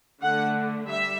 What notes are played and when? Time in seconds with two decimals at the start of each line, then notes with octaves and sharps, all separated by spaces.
0.22 D3 A3 D4 F#5
0.89 G3 E5